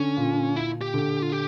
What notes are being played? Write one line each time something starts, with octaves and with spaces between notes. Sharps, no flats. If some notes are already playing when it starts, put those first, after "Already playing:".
Already playing: D3 C#4
A#2
E4
G4
D3
F4
G4